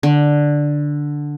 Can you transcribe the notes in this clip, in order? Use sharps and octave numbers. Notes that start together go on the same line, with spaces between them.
D3